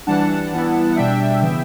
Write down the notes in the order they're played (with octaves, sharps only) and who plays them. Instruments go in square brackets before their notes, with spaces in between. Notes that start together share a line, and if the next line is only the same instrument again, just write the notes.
[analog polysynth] E3 G3 D4 F#5 A5
E3 G3 B3 E4
F#5
B2 G3 D4 E5 G5
C#3 E3 B3